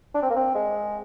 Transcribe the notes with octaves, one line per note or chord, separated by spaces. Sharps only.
D4
C4
A#3
C4
G#3